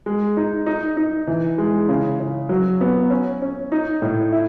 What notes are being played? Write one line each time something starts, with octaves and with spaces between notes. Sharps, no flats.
G#3
D#4
D#4
D#4
E3
G#3
C#3
C#3
F#3
B3
C#4
C#4
D#4
A2
E4